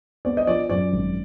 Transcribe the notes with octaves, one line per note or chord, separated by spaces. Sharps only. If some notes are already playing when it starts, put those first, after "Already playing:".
B3 D5
D#5
F3 D5
F#2 D5
G#1